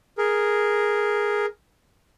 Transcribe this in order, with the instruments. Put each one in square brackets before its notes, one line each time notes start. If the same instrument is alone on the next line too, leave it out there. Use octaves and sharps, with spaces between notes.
[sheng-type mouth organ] G#4 A#4